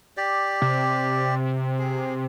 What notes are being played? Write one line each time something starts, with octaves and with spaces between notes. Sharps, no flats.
G4 D5
C3
G#4